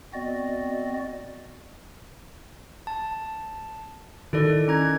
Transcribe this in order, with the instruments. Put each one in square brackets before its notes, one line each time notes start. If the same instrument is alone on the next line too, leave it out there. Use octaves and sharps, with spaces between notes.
[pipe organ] B3 C4 F#4 D5 D#5
[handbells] A5
[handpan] D#3 [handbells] E4 A4 D5
[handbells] C#4 A#5 G#6